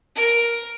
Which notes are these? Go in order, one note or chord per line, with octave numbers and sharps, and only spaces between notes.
A#4